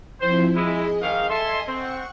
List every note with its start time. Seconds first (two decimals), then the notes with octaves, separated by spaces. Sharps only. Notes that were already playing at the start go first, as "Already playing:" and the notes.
0.21 F3 C4 E4 C5
0.56 G#3 E4 G#4 D#5
1.01 G#2 D#3 F5
1.30 A4 D#5 E5 G#5 C6
1.68 C4 F#5 C#6